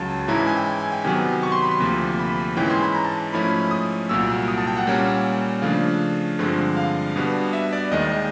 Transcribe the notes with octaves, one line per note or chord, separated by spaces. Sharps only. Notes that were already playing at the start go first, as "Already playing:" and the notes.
Already playing: C#2 C#3 F#3 A5
G#2 E3 G#3 C#4 E4 A#5
A5
G#5
G5
G#5
G#5
G5
C3 D#3 F#3 B3 G#5
C#6
C6
B5
C6
D2 C3 F3 A#3
B5
G#2 E3 G#3 C#4 E4 G5
C6
B5
A#5
A5
G#2 F3 A3 C#4 E4 B5
D#6
C2 A#2 F#3 E6
D#6
A5
G5
F#5
A#2 G3 A#3 C#4
C#3 F3 A3 D4 F5
G2 D3 F3 G#3 C4
F5
B2 G3 B3 D4
E5
D5
D#2 D#3 G#3 D#5